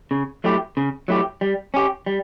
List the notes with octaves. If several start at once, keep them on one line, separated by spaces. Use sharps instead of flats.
C#3
F#3 A3 E4 G4
C#3
F#3 A3 E4 G4
G3
C#4 G4
G3